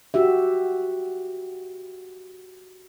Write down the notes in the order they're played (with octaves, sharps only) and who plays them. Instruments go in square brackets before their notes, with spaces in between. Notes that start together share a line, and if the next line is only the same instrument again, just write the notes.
[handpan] F#4 G4 E5